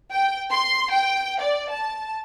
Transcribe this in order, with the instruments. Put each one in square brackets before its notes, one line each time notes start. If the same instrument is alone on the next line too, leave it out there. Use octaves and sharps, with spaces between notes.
[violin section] G5
C6
G5
D5
A5